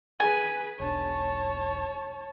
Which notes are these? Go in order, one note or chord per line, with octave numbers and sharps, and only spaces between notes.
G#4 B4 G#5
E1 B1 D4 C#5 A5